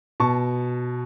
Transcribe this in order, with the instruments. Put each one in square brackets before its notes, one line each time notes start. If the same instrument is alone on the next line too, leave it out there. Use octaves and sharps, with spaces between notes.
[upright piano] B2 A5 C#6